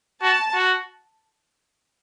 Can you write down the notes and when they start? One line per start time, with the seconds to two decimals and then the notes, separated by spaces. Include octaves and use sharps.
0.22 F#4 A5
0.54 F#4